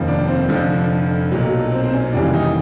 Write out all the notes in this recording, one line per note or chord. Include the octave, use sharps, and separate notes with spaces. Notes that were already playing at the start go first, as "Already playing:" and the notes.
Already playing: F1 D#2 C#3 F3
D4
C4
F1 F2 D3 F3
B1 A#2 F#3
C4
C4
C#4
F1 D#2 C#3 E3 G3 D4
D#4